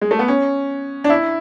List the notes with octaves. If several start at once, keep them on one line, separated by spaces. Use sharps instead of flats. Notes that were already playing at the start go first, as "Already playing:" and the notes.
G#3
A3
B3
C#4
D4
E4